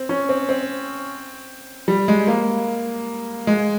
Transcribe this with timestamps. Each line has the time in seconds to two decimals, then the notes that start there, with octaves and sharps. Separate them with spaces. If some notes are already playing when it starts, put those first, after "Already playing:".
Already playing: C4
0.09 C#4
0.29 C4
0.49 C4
1.88 G3
2.08 G#3
2.27 A#3
3.47 G#3